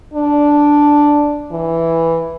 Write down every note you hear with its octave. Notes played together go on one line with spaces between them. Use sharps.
D4
E3